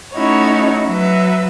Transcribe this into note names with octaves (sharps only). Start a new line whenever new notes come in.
A3 C#4 D#4 E4 F#4 C#5
F#3 B4 E5